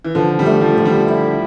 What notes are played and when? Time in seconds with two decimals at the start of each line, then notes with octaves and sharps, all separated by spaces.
0.05 E3
0.15 D3 F3
0.39 G3
0.46 A3
0.61 F3
0.78 D3
0.85 G3
1.08 E4